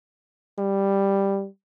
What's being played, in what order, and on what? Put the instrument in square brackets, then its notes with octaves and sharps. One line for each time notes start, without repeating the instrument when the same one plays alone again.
[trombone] G3